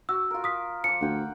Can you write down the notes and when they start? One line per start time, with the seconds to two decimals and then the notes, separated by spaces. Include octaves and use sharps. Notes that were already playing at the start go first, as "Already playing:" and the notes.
0.09 F#4 E6
0.31 F4 A#4
0.44 D#6 B6
0.84 F3 D6 C#7
1.01 D2 F#5 G5